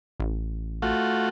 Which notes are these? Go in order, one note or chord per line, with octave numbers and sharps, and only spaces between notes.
A1
A3 F4 F#4